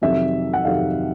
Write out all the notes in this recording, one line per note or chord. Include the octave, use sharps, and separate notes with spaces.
F2 C3 D#3 F#3 E5
F#5
F2 C3 D#3 F#3 F5